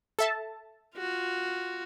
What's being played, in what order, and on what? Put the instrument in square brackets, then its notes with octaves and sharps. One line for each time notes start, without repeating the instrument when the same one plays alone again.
[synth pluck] A4 E5 A5
[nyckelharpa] F4 F#4